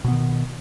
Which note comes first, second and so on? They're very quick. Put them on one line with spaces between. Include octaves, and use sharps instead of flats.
B2 B3 D#3